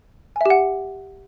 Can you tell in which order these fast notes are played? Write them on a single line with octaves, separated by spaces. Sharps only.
G#5 E5 G4 F#5